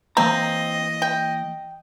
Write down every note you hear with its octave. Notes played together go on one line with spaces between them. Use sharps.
E3 A#3 C4 D#5 A#5
G5